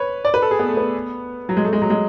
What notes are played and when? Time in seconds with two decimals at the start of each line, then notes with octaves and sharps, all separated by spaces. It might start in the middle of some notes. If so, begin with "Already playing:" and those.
Already playing: B4 C#5
0.25 D5
0.34 B4
0.42 A4
0.51 G#4
0.59 B3
0.69 A3
0.77 B3
1.49 F#3
1.57 G#3
1.64 A3
1.73 G#3
1.82 F#3
1.90 G#3